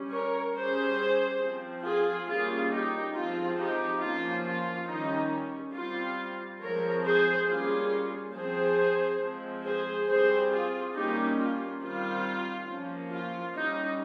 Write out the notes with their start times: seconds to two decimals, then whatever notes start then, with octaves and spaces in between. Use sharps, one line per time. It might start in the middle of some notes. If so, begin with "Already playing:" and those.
Already playing: G3 C#4
0.11 A#4 C#5
0.55 G3 C#4 G#4 C5
1.41 F3 C4
1.85 F4 G#4
2.28 G3 A#3 C#4 F4 G#4
2.72 D#4 G4
3.15 F3 G#3 C4 F4
3.58 D#4 G4
4.02 F3 A#3 C#4 F4
4.45 F4
4.88 D#3 G3 C#4 D#4
5.75 G3 C4 F4
6.61 F3 G#3 C4 A#4 C#5
7.05 G#4 C5
7.48 G3 A#3 C#4 F4 G#4
8.34 F3 C4 G#4 C5
9.22 F3 G#3 C4
9.65 G#4 C5
10.08 G3 C4 G#4 C5
10.52 F4 G#4
10.94 G3 A#3 C#4 D#4 G4
11.38 F4
11.82 D#3 G3 C4 F4
12.68 F3 A#3 C#4
13.12 F4
13.55 G3 C#4 D#4